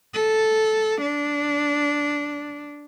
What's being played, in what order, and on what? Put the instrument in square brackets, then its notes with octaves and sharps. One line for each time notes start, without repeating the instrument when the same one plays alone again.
[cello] A4
D4